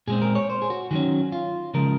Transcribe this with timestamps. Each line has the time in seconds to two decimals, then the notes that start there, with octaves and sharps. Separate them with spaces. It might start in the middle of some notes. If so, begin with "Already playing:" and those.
0.07 A#2 G#3 C4 G#4
0.22 A#4
0.35 C#5
0.50 C5
0.62 G#4
0.70 F#4
0.91 D#3 F#3 C#4 F#4
1.32 F4
1.74 C#3 F3 G#3 A#4